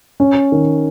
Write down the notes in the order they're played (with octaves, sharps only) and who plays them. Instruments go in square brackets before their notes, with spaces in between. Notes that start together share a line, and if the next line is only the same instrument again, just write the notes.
[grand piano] C#4
D#3